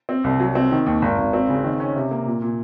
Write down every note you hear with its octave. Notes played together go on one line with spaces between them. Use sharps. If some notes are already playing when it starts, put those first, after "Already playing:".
C4
C2
F#3
C4
D#3
D#2
G#1
G#1
C4
C#3
D#3
C#4
C3
A#3
A#2
A#2